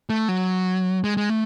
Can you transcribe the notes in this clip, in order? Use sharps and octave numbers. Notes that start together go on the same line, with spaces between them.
A3
F#3
G#3
G#3
A3